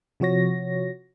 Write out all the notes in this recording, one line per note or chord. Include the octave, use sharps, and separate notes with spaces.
C3 F3 F#4 C#5 A#6